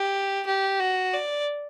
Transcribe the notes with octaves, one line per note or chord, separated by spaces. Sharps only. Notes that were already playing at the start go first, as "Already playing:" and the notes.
Already playing: G4
G4
F#4
D5